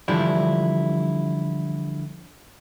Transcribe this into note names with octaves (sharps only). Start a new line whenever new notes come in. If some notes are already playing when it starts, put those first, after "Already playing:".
D3 E3 F3 G3 D4 E4